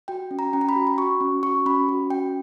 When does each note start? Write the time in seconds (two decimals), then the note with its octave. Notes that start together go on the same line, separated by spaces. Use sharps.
0.08 F#4 G5
0.31 C#4
0.39 A#5
0.53 C#4 G5
0.61 A#5
0.69 B5
0.76 F#4
0.87 B5
0.98 F#4 C#6
1.21 C#4
1.43 F#4 C#6
1.66 C#4 B5
1.89 F#4
2.10 C#4 G5